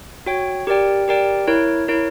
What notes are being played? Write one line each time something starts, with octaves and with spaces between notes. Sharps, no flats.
F#4 C#5 G5
G4 A#4 D5 G5
G4 A#4 D5 G5
E4 A#4 C#5
E4 A#4 C#5